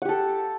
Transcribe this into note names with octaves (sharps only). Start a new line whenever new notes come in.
G4 A4 F#5